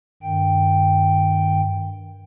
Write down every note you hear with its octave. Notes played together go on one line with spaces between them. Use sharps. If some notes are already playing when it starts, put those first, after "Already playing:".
G2 D#3 G5